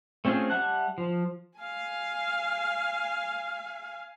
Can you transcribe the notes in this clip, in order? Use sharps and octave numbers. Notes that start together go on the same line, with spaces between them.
A3 C4 C#4 F4 G#4
G3 E5 F#5 A5 F#6
F3
F5 G#5